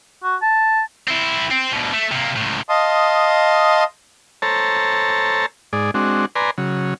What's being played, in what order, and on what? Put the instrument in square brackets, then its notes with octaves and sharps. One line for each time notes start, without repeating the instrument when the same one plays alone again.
[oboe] F#4
A5
[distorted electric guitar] C4 E4
C4
D2 B2
A3
C3 A#3
C#2 A2
[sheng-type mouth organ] D#5 F5 A5 C6 D#6
[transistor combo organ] A4 C5 C#5 A5 A#5
G#2 G#4 D5
G#3 C4 D4 F#4
B4 D5 G#5 A#5 C6
C#3 F#3